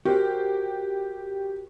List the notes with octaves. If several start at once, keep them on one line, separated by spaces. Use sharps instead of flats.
F#4 G4 A#4 C5